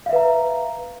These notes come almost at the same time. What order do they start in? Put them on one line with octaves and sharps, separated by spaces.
F5 E5 B4 A#5